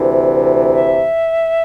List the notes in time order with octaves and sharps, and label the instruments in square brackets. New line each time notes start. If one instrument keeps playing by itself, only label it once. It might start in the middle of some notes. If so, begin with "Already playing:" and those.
Already playing: [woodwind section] D2 C3 E3
E5